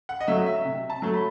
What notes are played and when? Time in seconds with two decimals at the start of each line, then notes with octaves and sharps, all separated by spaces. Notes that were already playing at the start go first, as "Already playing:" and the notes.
0.09 F#5
0.20 D#5
0.28 F#3 A3 E5
0.46 E5
0.65 C3
0.90 A5
1.02 F#3 A3
1.14 B5